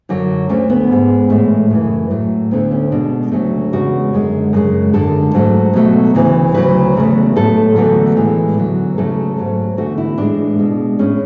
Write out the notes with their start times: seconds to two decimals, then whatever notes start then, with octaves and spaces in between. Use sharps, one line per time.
0.09 F#2 D3 F#3
0.49 D2 D3 A3 C#4
0.70 B3
0.89 G#2 G#3
1.30 A2 E3 G#3 A3
1.70 F#2 C#3 E3
2.10 A2 F#3 A3
2.51 D2 D3 A3 B3
2.71 C#4
2.92 B2 G#3 D4
3.32 D2 C#3 F#3 A3
3.72 E2 C#3 G#3 F#4
4.13 F#2 D3 G#3
4.53 F#2 C#3 G#3
4.93 F#2 D3 G#3 A4
5.33 G#2 F#3 A3
5.74 B2 F#3 A3
6.14 D2 C#3 E3
6.54 D2 C#3 F#3 B4
6.95 E2 C#3 F#3 A3
7.36 A2 F#3 A3 A4
7.76 E2 D3 F#3 A3
8.16 A2 E3 G#3
8.56 E2 D3 F#3
8.97 E2 C#3 F#3 A3 A4
9.37 G#2 F#3 A3
9.77 E2 D3 A3 F#4
9.98 E4
10.18 A2 E3 G#3 D4
10.58 B2 G#3
10.99 A2 G#3 C#4